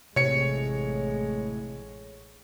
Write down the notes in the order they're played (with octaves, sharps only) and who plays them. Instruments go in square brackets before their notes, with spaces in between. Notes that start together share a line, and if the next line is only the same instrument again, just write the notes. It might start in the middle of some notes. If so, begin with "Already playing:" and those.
[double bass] A1 G#3 [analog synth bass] A2 [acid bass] C3 [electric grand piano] C#5 C#7